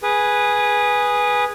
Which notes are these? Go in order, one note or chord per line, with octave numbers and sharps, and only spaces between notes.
G#4 B4